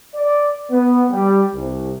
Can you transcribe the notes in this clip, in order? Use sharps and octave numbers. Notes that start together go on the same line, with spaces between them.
D5
B3
G3
C2